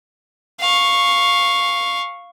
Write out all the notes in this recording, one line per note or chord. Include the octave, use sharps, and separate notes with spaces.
F5 C#6